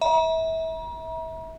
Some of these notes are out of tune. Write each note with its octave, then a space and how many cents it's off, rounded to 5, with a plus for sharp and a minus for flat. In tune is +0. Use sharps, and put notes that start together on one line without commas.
E5 -30 A#5 +40